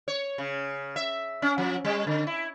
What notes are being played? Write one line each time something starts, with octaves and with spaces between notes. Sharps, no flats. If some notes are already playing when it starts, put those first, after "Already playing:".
C#5
C#3
E5
C#4
F3
G3
D3
E4